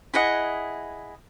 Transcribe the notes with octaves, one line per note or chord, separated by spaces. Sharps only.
E4 G#4 D#5 F#5